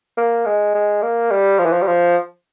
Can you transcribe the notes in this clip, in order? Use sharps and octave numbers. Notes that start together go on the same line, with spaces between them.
A#3
G#3
G#3
A#3
G3
F3
E3
F3
G3
F3